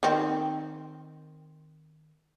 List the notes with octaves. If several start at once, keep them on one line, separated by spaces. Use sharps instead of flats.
D#3 C4